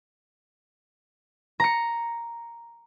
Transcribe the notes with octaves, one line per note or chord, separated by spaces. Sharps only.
A#5 C#7